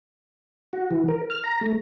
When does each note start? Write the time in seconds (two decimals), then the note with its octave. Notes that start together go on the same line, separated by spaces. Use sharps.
0.73 F#4
0.91 E3
1.08 A#4
1.30 F6
1.44 A#5
1.61 A3